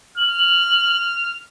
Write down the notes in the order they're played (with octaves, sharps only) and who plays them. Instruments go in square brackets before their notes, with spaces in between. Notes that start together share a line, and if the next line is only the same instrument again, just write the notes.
[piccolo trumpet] F6 [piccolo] F#7